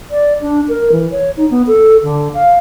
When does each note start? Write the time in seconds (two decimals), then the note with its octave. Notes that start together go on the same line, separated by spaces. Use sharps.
0.11 D5
0.41 D4
0.69 A#4
0.92 E3
1.11 C#5
1.37 D#4
1.51 B3
1.67 A4
2.03 D3
2.34 F5